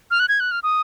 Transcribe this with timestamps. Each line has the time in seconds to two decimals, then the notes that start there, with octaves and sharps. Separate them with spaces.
0.11 F6
0.20 F#6
0.29 G#6
0.40 F#6
0.51 F6
0.63 D#6